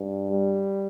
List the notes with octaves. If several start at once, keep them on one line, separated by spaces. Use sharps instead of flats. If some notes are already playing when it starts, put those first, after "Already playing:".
Already playing: G2
G3